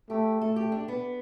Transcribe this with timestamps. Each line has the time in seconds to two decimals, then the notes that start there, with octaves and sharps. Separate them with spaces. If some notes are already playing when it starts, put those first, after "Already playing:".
0.10 A3 G4
0.40 A3 A4
0.56 G4
0.72 D4
0.88 B3